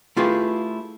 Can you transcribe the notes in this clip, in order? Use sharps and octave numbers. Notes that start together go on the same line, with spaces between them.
A3 E4 F4 G4 G#4 B4